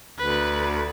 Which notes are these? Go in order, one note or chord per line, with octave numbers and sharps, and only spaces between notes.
D2 B4